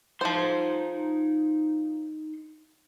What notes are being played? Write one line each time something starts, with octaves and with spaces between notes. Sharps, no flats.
F3 D#4 C5 C6